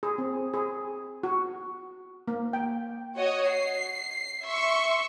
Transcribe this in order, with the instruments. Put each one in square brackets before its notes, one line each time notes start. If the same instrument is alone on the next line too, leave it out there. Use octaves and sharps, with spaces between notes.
[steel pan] G#4
C4
G#4
F#4
A#3
G5
[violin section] F#4 C#5 D#5
C7
E5 C6 C#6